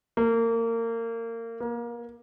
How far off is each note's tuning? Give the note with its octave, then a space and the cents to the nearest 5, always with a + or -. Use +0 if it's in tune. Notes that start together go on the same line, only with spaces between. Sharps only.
A#3 -30
A#3 +25